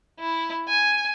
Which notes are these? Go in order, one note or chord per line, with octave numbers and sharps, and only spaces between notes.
E4
G#5